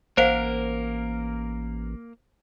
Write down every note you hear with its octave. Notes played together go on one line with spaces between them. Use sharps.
A1 A#3 A#4 C5 F5 F#5